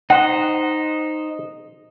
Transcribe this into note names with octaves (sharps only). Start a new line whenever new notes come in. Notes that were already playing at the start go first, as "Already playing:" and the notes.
D#4 C5 D#5 F#5